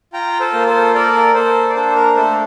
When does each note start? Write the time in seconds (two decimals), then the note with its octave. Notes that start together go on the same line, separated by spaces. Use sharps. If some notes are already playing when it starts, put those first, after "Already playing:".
0.13 F4 G5 A#5
0.39 A4 C5
0.53 A#3
0.67 A4 C5
0.94 A4 A#4 D5
1.34 A#3 A4 C5
1.70 D5
1.75 D4 A4 C5
1.96 A#4
2.16 A3 A4 C5